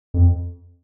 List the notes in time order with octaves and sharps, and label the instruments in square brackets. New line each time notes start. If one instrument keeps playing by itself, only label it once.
[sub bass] F2